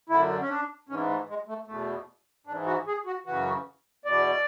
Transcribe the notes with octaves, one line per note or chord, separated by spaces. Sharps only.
F#2 D3 E4
C#4
D4
G#2 E3 C#4
A3
G#3
A3
E2 B2 A3
G#2 E3 D4
F#4
G#4
F#4
F#2 C#3 E3 F#4
E2 B2 D5